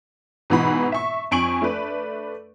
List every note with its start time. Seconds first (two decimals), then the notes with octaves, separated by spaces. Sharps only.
0.50 G#2 B2 E3 F#5 B5
0.92 E5 C#6
1.31 F2 G#5 C#6 D7 F#7
1.62 A3 D4 B4